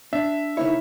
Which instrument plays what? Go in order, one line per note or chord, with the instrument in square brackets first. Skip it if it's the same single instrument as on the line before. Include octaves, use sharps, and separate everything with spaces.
[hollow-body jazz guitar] D4 [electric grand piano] E5
[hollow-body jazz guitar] C#3 A#3 C#5 [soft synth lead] D#4 [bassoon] E4